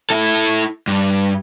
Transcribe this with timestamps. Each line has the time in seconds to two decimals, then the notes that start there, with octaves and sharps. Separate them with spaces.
0.10 E4 A4
0.87 G2